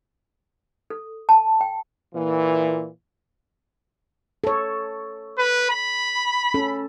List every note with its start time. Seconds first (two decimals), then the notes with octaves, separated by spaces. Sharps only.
0.90 A4
1.29 A5
1.61 G5
2.14 A#2 E3
4.44 A4 C#5
5.39 B4
5.70 B5
6.54 C#4 A4